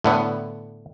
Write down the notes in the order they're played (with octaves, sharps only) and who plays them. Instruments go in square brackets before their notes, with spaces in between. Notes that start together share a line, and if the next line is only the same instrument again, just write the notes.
[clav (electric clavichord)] A2 D3 B3